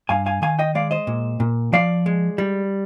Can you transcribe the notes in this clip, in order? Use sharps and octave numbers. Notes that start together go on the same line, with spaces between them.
G2 F5 G#5
F5 G#5
D#3 F5 G#5
D#5 G5
G#3 D5 F5
C5 D#5
A#2
A#2
F3 D5 F5
G#3
G3